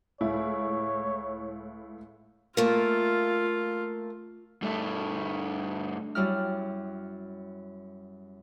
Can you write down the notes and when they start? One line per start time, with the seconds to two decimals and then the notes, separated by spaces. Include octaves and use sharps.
0.21 C#2 A2 E4 C#5
2.57 A3 A#3 F4
4.62 G2 A3
6.15 F#2 G3 E4 F6